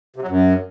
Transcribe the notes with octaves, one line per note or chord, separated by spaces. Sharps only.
C3
F#3
F#2